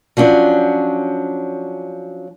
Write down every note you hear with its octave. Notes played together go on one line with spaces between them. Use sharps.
F3 F#3 C#4 D4